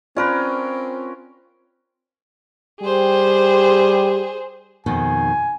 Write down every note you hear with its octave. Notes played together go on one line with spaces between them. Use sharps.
C4 C#4 F4 A#4 B4 D5
G3 G4 G#4 C5
F2 B2 D#3 G#5